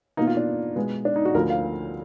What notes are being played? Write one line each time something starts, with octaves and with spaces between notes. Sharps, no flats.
B2 A#3 D#4
F4
D4
B2 G#3 B3
D4
D#4
F#4
D2 D3 F3 A#4
F5